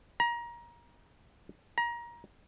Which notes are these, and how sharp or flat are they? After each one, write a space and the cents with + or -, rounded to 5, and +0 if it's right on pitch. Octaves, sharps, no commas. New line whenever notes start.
A#5 +25
A#5 +25